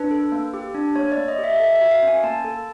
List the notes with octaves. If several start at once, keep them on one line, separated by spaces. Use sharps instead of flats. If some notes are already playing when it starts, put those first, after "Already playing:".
Already playing: D4 B4
A4
A#3
G4
D4
A#3 C#5
D5
A#3
D#5
G4
E5
A4 E5
E5
F#4
F5
C#4 G#5
A#3 A5
A4